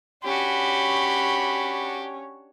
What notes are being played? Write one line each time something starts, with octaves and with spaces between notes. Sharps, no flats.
C#4 D4 F#4 G4 B5